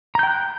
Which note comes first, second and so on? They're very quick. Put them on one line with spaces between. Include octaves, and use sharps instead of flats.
A#5 G6 G5 F#6